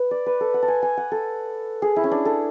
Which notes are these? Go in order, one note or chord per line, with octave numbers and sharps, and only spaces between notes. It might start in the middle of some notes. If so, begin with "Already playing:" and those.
Already playing: B4
D5
B4
A4
F#5
A5
G#5
G#5
F#5
A4
G#4
E4
C#4
D4
A4